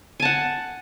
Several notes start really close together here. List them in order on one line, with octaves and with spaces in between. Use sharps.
G#5 A5 F#5